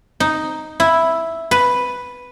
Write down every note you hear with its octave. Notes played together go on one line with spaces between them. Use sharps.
D#4
E4
B4